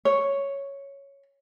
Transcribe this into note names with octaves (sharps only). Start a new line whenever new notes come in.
C#5